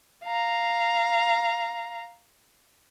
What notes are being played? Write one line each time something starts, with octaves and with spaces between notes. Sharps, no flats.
F5 A#5